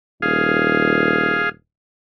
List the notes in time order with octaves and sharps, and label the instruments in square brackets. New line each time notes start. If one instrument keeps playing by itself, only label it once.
[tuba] D#1 [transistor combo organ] G#4 F5